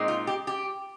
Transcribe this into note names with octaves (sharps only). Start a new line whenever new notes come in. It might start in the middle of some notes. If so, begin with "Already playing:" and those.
Already playing: A#2 G#3 C4 D#4
F4
G4
G4